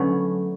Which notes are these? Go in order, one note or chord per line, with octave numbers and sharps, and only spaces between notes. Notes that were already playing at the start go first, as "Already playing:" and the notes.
Already playing: D3 F#3 A3 B3 C#4